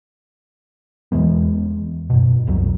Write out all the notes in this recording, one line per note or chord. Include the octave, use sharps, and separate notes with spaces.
E2 E3 G#3 B3
F#2 B2
B1 F2 F#3